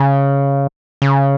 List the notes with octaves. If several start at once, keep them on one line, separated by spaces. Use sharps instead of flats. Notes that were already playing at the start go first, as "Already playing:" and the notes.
Already playing: C#3
C#3